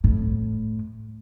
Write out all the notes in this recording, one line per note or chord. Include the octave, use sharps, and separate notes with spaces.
A2